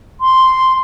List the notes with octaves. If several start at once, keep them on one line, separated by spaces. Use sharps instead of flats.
C6